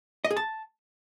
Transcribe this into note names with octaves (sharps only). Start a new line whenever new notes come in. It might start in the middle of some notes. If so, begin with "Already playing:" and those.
D#5
G#4
A5